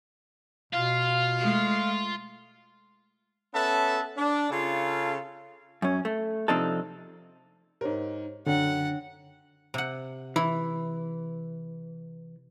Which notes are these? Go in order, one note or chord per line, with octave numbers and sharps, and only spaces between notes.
B2 F4 F5
G#3 A3
B3 C#4 A4 B4 E5 A5
D4
C#3 F4 A4
F#2 C#4
A3
C3 F3 C4 D4 D#4 A4
G#2 G4 A#4 C5 C#5
F#2 D3 D4 C#5 F#5 G5
C3 F#5
E3 E4